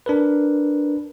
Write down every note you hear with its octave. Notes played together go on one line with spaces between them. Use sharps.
D4 A#4 B4